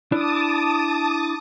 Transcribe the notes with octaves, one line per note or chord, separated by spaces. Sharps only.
D4 E4 D5 A5 D6 D#6